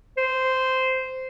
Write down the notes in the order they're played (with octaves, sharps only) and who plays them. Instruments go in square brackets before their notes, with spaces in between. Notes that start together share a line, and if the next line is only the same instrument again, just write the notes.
[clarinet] C5